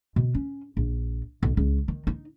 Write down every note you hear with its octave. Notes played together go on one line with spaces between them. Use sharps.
B2
C#4
A#1
B1
C#2
D#3
D#4